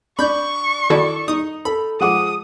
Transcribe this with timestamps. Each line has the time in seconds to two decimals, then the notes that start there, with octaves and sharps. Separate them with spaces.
0.19 D4 B5 C#6 G6
0.90 D#3 E4 F#4 A4 D5
1.28 D#4 D#6
1.65 A4 B5
2.01 F3 G#3 F#5 D6 D#6